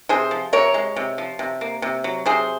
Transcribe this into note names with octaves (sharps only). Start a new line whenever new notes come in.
C3 G#4 C5
F3
C3 A#4 C#5
G#3
C3
F3
C3
A#3
C3
F#3
C3 G#4 C5